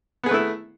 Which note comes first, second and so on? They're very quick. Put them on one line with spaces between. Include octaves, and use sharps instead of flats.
B3 G#4 B4 A3 E4